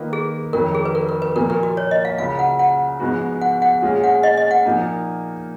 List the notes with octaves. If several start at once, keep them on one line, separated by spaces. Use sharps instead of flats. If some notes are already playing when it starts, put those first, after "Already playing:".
Already playing: D#3 A#3 F4 B4 D#5
G#4
F2 D#3 F#3 A#4
G#4
B4
A#4
A#4
B4
A#2 F3 A#3 A#4
A#4
F#4
C#5
D#5
F5
C#2 C#3 F#3 F5
F#5
F#5
G#2 F3 G#3 B3 F#4
F#5
F#5
A#2 G#3 C#4 F4 G#4
F#5
D#5
D#5
F#5
A#2 F3 A#3 D#4